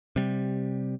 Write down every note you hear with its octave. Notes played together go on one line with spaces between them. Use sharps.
C3 G3